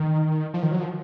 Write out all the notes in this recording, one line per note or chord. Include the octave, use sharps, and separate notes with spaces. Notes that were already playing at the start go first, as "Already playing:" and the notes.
Already playing: D#3
F3
D#3
F#3
F3